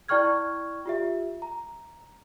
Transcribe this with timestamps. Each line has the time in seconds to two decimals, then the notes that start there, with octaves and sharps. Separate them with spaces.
0.09 E4 D5 G5 C#6 F6 G#6
0.86 F4 G4 E5
1.42 A#5